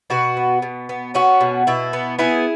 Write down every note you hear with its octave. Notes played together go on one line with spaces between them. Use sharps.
B2 F#4 B4
B3
B2
B3
B3 C#4 F#4
B2
B2 E4
B3
B3 E4 G#4